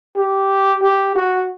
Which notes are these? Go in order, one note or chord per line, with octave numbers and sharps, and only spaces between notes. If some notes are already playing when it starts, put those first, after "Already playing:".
G4
G4
F#4